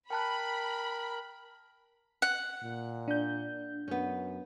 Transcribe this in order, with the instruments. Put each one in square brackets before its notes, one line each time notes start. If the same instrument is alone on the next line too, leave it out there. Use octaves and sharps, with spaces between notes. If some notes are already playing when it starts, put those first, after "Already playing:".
[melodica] A#4 [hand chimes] G5 A5 F#6 [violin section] B5
[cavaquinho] F#5
[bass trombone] A#2
[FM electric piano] D4 G6
[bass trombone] F#2 [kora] B3 C#4